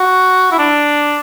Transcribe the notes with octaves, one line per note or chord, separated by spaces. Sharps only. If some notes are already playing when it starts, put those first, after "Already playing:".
Already playing: F#4
E4
D4